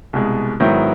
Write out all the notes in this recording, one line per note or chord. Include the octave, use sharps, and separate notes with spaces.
C2 B2 G#3
G#2 D#3 F#3 B3 E4